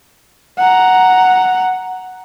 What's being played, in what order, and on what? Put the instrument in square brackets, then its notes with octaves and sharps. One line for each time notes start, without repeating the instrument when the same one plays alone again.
[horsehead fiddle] F#5 A#5